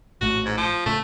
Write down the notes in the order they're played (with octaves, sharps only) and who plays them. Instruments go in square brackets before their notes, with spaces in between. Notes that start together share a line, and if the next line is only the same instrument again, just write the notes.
[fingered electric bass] A#1 A2 A3 [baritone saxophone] F#4
[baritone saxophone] G#2
F3
[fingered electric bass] A2 C#3 [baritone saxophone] A3